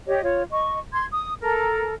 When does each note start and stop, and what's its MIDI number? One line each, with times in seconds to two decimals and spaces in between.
0.06 0.22 67
0.06 0.22 73
0.06 0.22 75
0.23 0.42 65
0.23 0.42 73
0.51 0.78 75
0.51 0.78 85
0.92 1.05 84
0.92 1.05 92
1.11 1.33 87
1.41 1.93 69
1.41 1.93 70